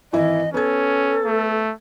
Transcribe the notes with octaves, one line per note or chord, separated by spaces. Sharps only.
G#1 E3 E4 D#5
B3 C#4 A4 G#6
A3